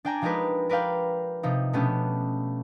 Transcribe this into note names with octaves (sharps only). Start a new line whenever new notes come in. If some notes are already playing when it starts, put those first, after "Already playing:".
D4 D5 G5 G#5 A#5
F3 G#3 D#4 G4 A#4 B4
A#4 B4 D5 F5 G5
C3 F3 D#4
B2 A3 B3 C#4 D4 G4